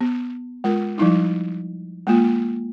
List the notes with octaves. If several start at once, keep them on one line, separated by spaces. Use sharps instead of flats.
B3
G#3 F4 A#4
F3 G3 D#4 E4
G#3 A#3 F4